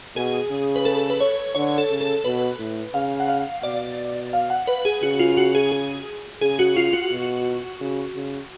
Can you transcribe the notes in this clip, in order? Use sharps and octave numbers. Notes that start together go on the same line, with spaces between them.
B2 G#4
C#3
B4
A4
B4
C#5
D3 C#5
A4
C#3
A4
B2 B4
A2
C#3 F5
F#5
F5
B2 D5
F5
F#5
B4
G#4
C#3 F#4
F4
F#4
G#4
G#4
C#3 G#4
F#4
F4
F#4
B2
C#3
C#3